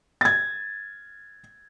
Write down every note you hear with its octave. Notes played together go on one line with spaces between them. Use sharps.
G#6 A6